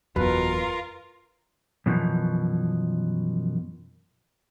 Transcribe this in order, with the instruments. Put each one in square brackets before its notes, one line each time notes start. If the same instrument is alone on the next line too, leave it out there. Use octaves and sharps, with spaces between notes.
[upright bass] F#1 E2 [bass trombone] B2 [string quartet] F4 A#4 [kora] B4
[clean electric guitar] F#2 B2 E3 F3